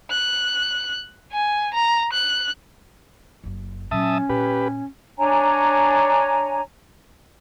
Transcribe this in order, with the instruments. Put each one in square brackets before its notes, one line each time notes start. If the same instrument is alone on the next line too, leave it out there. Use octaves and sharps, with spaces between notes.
[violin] F#6
G#5
A#5
F#6
[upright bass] F#1 F#2
[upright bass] A#2 F#3 [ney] C#4 [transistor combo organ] E5 A5 D#6
[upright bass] A#2 [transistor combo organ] G4 B4
[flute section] D4 C#5 G#5 A#5